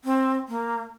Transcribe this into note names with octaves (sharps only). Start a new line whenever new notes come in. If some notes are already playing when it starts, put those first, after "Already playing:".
C4
A#3